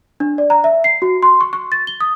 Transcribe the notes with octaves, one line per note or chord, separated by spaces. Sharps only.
D4
D5
A#5
E5
C7
F#4
C6
C#6
C#6
A6
G7
D#6